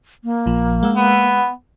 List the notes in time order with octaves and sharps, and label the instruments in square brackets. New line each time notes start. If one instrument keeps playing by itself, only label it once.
[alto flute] A#3
[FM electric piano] A#1 F3
G#3 F#5 E6
[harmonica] B3